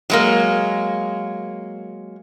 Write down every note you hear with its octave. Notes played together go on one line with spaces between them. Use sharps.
F#3 G#3 A#3